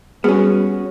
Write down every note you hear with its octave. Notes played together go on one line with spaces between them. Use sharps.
G3 B3 C#4 F#4 G#4